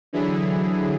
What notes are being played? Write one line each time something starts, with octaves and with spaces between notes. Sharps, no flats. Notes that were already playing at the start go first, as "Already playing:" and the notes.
D3 E3 F#3 E4 G#4